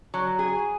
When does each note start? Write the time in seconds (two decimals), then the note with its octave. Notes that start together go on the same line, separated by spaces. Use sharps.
0.14 F#3
0.39 G#4